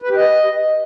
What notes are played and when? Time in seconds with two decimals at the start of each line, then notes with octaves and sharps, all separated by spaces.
0.02 B4
0.09 G4
0.16 D#5